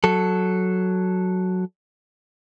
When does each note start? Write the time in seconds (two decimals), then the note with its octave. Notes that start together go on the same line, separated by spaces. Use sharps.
0.04 F#3 A4